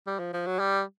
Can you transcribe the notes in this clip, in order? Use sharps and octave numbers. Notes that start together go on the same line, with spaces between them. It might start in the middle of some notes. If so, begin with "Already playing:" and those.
G3
F3
F3
F#3
G3